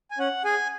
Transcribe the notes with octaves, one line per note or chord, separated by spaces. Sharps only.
G#5
C#4 F#5
G#4 G#5